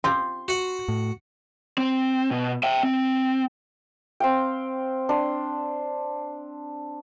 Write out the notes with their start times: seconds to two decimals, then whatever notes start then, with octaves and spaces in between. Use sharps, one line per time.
0.04 C4 F4 G4 C6
0.48 F#4 F#5
0.88 A2
1.78 C4
2.31 B2
2.63 E5 G5
2.83 C4
4.20 C4 F5 G5
5.09 D4 C6